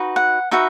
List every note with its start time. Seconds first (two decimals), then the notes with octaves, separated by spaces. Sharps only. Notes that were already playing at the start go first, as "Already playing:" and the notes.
Already playing: D#4 F#4 B4
0.16 F#5
0.51 D#4 F#4 B4 E5